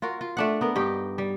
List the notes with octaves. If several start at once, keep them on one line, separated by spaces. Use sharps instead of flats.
F4 F#4 A#4
F4
A3 D4 F#5
B3 A#4
G2 D#4 G4
G3